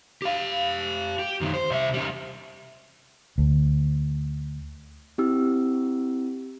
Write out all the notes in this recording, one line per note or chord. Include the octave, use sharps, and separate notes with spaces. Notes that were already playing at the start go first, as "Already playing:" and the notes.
G4 F5
G4
F#2 D#3
C5
C2 E5
G3 C#4
D2
C4 E4 G4 E6